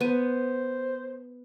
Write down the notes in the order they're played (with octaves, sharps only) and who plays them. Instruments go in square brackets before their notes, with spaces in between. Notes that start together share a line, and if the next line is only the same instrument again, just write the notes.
[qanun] B3 [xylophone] B4 D#7 [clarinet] C5